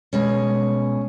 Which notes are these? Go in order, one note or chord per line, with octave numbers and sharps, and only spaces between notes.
B2 G#3 C#4